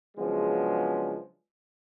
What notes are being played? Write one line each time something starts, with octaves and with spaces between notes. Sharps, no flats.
C#3 F3 F#3 G#3 B3 D4